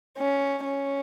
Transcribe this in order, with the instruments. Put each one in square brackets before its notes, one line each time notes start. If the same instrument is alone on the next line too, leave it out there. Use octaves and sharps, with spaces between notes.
[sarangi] C#4
C#4